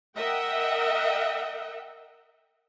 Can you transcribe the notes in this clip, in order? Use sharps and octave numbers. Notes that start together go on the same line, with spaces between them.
A#4 D#5 E5 F#5 G5